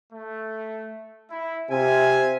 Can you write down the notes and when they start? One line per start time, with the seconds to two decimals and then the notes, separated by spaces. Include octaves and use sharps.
0.13 A3
1.30 E4
1.71 C3 F4 E5 G#5